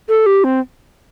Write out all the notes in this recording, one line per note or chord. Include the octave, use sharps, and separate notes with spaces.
A4
G4
C4